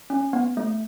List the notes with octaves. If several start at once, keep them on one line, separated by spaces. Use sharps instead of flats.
C#4
B3
A3